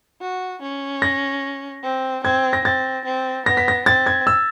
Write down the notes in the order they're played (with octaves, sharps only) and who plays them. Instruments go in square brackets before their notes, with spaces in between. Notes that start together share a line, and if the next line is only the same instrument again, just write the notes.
[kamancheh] F#4
C#4
[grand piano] A#6
[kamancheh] C4
[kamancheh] C4 [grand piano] G#6
[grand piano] A#6
[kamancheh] C4 [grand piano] A6
[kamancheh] C4
[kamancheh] B3 [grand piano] A#6
[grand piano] B6
A#6
[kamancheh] C4 [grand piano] A6
[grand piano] G#6
E6